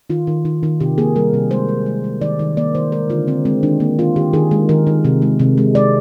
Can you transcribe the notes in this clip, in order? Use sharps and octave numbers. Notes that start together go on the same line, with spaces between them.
D#3 F4
D#3
D#3
D#3
C3 G4
A#3 G#4
G3 A#4
C3
G#3 C5
G#3
G#3
G#3
D#3 D5
D#3
A#3 D5
D#3 C5
G#3 A#4
D3 F4
D3 C4
G#3 C4
D#3 D4
A#3
D#3 F4
D#3 G4
D#3 G#4
G#3
D#3 A#4
D#3
C3
G#3
C3
G#3
G#3 D5